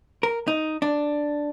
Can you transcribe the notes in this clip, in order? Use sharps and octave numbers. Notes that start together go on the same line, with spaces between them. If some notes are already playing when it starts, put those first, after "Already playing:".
A#4
D#4
D4